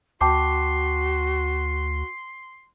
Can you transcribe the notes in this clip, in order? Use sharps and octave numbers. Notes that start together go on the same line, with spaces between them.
D2 F#4 G5 A5 C6 D6